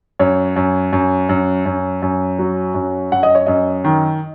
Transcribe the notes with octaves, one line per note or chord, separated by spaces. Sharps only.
F#2 C#5
F#2
F#2
F#2
F#2
F#2
F#3
F#2
F#2 F#5
D#5
C#5
F#2 D#5
D#3